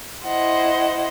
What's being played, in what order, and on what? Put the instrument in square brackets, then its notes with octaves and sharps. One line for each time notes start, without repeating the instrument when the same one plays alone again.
[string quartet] E4 C5 D#5 F#5